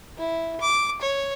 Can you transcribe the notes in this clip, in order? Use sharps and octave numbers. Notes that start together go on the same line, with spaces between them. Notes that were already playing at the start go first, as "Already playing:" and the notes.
E4
D6
C#5